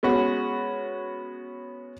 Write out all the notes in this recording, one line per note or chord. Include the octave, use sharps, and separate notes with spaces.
G#3 B3 C#4 F#4